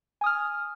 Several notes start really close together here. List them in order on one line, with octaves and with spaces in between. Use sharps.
G#5 D#6 F6